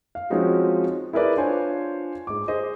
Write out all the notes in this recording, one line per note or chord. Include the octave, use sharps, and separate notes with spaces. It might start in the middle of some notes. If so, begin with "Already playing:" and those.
F5
F3 G#3 C4 C#4 D#4 F#4
E4 G#4 A#4 B4 D5
D4 F4 C5 C#5 G#5
G#2 D6
G#4 C5 D#5